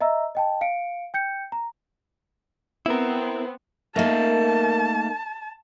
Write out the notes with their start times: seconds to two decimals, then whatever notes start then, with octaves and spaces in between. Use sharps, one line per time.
0.01 D#5 E5 A#5 E6
0.35 D#5 G5 A5
0.61 F5 C#7 D7
1.14 G5 G6 C#7
1.52 A#5
2.86 B3 C4 E4 A#4
3.96 A3 A#3 D#4 A#4 E5 A5